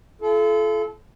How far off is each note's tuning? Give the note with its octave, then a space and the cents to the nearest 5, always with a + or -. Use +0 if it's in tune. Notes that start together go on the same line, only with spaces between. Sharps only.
F4 -45 A4 -30